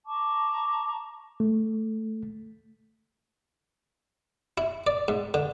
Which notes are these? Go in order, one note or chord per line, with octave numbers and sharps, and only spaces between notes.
A5 A#5 C#6 D6
A3
E4
D5
G#2
D3